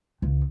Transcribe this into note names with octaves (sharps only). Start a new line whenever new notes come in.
C#2